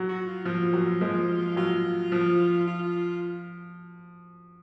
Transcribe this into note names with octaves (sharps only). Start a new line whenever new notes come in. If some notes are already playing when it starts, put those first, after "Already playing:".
Already playing: F#3
F#4
F4
F3 F4
F#3
F3 G#3
F#3 F4
F3
F4